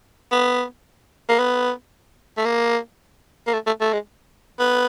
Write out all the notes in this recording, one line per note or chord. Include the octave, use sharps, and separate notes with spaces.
B3
A#3
B3
A3
A#3
A#3
A3
A3
A3
G#3
B3